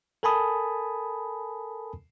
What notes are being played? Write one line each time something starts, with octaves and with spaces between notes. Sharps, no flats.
A4 A#4 G#5 A5 B5 D#6